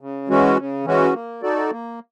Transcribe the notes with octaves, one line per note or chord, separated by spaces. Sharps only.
C#3
E3 G#3 C#4 F#4
C#3
E3 G#3 C#4 F#4
A#3
D#4 F#4 A4 D5
A#3